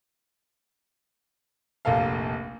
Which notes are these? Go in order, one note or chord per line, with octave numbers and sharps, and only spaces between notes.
F1 A#1 A#3 A4 F5